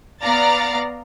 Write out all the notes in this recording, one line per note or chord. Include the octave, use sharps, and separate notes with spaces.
B3 D5 F5 A#5 A6